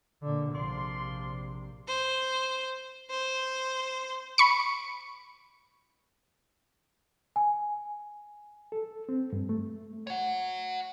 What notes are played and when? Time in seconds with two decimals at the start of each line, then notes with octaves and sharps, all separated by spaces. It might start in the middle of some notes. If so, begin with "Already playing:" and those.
0.22 A#2 D3
0.54 A#1 C3 F3 D5 C6
1.88 C5
3.10 C5
4.38 B5 C#6 C#7
7.36 G#5
8.72 A4
9.09 C4
9.33 G2
9.49 A3
10.07 C#5 F#5